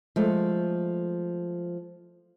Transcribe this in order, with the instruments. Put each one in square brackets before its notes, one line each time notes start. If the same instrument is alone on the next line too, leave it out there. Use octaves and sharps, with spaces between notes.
[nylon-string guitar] F3 G#3 A3